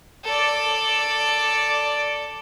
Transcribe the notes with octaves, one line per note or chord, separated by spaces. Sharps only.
A4 D5